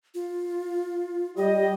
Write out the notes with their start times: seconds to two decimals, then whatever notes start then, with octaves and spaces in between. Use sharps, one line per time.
0.15 F4
1.37 G3 G4 D#5